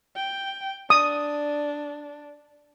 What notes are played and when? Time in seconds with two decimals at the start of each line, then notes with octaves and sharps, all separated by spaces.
0.16 G5
0.90 D4 D#6